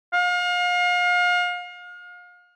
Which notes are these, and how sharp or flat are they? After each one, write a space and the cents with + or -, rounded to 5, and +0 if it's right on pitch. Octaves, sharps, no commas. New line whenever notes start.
F5 +35